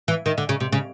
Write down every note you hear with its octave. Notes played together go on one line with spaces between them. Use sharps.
E3
D#3
D3
C#3
C3
C#3